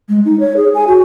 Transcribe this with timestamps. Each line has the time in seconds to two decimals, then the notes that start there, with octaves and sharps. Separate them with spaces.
0.09 G#3
0.25 D#4
0.40 C#5
0.57 G#4
0.75 G#5
0.88 F#4